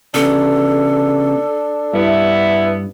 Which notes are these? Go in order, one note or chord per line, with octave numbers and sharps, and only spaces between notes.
C#3 B3 D4 A4
G2 B3 E4